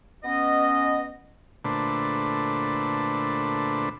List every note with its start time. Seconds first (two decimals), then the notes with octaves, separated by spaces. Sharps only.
0.24 B3 C#4 D#5
1.65 A#2 D3 A3 D4 B4 C5